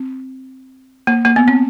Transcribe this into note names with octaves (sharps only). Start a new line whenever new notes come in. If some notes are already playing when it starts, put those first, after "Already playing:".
Already playing: C4
A#3
A#3
B3
C4